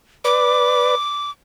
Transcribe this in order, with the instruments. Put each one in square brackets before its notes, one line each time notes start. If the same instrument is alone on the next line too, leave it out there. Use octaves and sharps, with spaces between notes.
[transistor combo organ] B4 D5 [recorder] D6